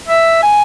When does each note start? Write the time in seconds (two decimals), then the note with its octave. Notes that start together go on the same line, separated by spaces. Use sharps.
0.08 E5
0.43 G#5